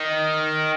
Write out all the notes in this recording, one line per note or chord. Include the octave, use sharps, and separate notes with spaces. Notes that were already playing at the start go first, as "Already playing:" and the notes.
Already playing: D#3